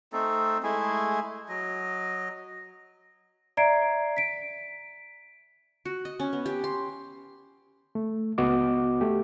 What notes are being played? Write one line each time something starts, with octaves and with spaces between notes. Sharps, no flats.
A3 C4 D#4 A4
G#3 A3 E4 G#4
F#3 D#5
D5 E5 A#5 G#6 C7 D7
B6 D7
F#4
D#5
C#4
B3
G4
C6
A3
C#2 B3 F#4 D#5 D6
A3 G4